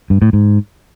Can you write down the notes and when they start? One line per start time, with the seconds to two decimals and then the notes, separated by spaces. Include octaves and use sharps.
0.10 G2
0.22 A2
0.33 G#2